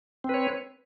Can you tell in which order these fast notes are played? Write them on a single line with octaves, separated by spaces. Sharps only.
C4 B4 C#5